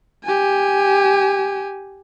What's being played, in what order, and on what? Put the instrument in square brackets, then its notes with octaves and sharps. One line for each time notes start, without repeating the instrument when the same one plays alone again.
[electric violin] G4 G#5